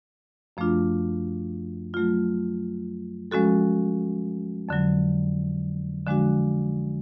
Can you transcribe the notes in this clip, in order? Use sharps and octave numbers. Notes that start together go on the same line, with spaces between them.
F#2 F3 A3 D4 F4
F#3 A3 F4
F3 G#3 C#4 F#4 A4
F2 D3 F#3
D3 F3 G#3 D4 F#4